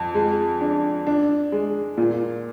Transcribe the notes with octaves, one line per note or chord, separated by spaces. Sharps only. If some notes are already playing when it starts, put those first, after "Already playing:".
Already playing: F2
G#3
D4
D4
G#3
A#2